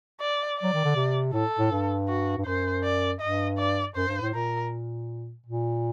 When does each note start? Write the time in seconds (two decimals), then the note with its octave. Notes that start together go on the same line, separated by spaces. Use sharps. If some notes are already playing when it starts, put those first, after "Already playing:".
0.20 D5
0.59 F#3 D5
0.74 D#3
0.85 D3
0.96 C3
1.33 A2 A4
1.59 A2
1.71 G2
2.08 F#4
2.37 G2
2.45 F#2 C5
2.84 D5
3.21 G2 D#5
3.58 D5
3.96 F#2 C5
4.08 G2
4.21 A2
4.34 A#2 A#4
5.46 A#2